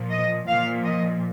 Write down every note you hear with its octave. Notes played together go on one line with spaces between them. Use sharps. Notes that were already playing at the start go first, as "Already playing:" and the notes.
Already playing: A#2 F3
D#5
A#2 F3 F5
D#5